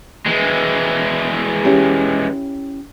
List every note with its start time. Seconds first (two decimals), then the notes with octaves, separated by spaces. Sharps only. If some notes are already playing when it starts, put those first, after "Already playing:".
0.26 E3 G#3
1.64 C#4 E4 G4